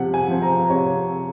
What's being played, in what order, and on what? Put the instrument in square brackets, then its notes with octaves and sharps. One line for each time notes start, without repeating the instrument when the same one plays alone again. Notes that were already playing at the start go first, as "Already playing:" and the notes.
Already playing: [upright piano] C3 F3 C4 F#5
G#5
F3 C4
A#5
C3 C#5